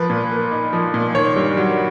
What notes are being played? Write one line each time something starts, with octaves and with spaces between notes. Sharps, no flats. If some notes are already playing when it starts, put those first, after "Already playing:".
Already playing: F3 B4
A#2
A#3
D#4
F3
A#2
D#3 C#5
G2
F#3